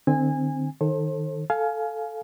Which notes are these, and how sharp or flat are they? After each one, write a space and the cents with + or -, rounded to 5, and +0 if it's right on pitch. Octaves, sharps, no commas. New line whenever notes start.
D3 +40 C4 +0 G#5 -20
D#3 +0 A4 +10 C5 +35
A4 +0 F5 +0 G#5 +25